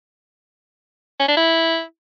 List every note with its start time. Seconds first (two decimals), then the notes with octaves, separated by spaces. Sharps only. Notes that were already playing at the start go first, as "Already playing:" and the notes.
1.20 C#4
1.29 D4
1.37 E4